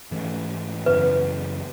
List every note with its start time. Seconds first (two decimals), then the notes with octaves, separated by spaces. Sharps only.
0.11 G#2 E3 A3 C#4
0.86 F#2 C#3 E3 B3 B4